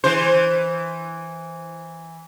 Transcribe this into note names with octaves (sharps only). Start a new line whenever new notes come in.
E3 C5